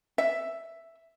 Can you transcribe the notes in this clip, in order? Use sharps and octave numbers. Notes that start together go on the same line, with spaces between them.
E5